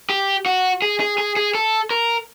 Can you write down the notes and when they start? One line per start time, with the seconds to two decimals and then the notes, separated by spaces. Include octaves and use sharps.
0.10 G4
0.46 F#4
0.82 G#4
1.00 G#4
1.18 G#4
1.37 G#4
1.55 A4
1.91 A#4